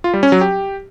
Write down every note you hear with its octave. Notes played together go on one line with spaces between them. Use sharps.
F4
G3
C#4
F#3
G4